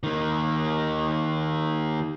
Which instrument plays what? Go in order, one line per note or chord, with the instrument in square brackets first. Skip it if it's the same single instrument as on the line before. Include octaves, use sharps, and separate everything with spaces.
[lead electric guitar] D#3 A#3